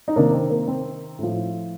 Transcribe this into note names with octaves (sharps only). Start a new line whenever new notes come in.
D#4
C3 D#3 A#3 D4
C4
A#3
C4
A2 F3